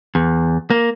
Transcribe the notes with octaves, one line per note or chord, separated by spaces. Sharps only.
E2
A#3